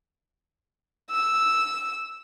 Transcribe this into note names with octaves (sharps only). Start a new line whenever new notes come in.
E6